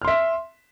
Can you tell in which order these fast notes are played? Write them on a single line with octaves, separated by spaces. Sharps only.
F6 C6 E5